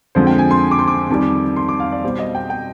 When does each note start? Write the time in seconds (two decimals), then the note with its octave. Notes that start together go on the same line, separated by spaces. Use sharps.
0.15 F2 D3 F3 G#3 C5
0.27 G5
0.39 G#5
0.51 C6
0.71 D6
0.79 C6
0.87 D6
1.10 F2 D#3 G3
1.56 C6
1.69 D6
1.80 F5
1.92 D5
2.04 B2 G3 C5
2.19 D#5
2.35 G5
2.50 G5